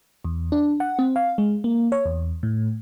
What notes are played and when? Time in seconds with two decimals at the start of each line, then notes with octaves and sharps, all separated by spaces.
0.25 E2
0.52 D4
0.80 F#5
0.99 C4
1.16 F5
1.38 G#3
1.64 A#3
1.92 C#5
2.05 E2
2.43 A2